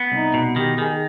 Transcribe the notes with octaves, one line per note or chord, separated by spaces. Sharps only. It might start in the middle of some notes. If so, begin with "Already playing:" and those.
Already playing: B3
C2 D#4
B2
D#3 G4
D#3 G#4